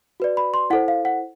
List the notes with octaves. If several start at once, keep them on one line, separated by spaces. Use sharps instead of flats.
F#4 B4 D5
B5
C6
E4 A4 C5 F#5
F5
F#5